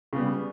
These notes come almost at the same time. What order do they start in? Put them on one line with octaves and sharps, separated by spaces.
C#3 B3 G3